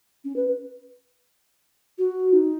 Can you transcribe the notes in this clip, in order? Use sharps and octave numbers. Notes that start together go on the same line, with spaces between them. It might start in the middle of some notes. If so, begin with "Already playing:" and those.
C#4
B4
F#4
D#4